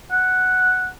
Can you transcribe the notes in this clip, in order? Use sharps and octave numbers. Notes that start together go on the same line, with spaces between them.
F#5